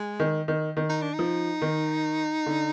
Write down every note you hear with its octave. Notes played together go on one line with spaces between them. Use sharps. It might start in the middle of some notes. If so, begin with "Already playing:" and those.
Already playing: G#3
D#3
D#3
D#3
D#4
D4
D#4
F3
D#3
D3